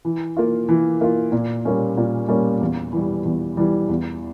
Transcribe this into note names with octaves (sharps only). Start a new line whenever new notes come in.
E3
A#3 F4
E3
A#3 F4
A#2
G3 A#3 C#4
A#2
G3 A#3 C#4
E2
E3 G3
E2
E3 G3
E2